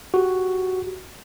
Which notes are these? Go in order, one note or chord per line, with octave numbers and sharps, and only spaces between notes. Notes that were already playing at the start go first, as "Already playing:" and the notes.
F#4 G4